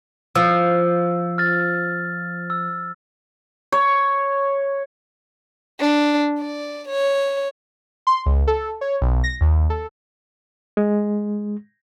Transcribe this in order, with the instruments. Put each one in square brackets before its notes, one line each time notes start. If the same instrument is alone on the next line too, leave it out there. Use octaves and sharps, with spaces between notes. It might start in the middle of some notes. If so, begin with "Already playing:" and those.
[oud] F3 [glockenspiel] E6
[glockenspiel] F6 A6
E6
[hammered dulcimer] C#5
[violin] D4
D5
C#5
[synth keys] C6
C#2
A4
C#5
B1
A#6
D#2
A4
[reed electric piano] G#3